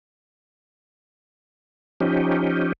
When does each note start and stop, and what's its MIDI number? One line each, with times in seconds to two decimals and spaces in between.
2.01 2.73 53
2.01 2.73 61
2.01 2.73 63
2.01 2.73 67